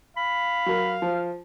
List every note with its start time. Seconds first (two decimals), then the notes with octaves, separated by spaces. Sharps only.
0.17 F5 B5
0.66 F#3 A#4
1.02 F3